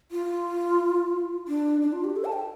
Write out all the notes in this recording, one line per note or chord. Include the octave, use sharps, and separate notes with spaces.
F4
D4
D4
F4
G4
A4
A5
G5